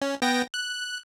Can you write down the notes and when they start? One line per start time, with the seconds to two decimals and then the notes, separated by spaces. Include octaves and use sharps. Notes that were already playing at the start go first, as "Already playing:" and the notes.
0.02 C#4
0.22 B3 G5 A#6
0.54 F#6